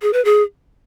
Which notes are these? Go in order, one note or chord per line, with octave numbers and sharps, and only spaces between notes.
G#4
B4
G#4